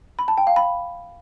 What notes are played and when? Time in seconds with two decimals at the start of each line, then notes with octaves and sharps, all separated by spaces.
0.19 B5
0.28 A5
0.37 G5
0.47 F5
0.56 B5